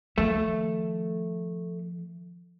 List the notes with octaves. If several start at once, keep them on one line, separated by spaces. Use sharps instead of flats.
D#3 F3 A3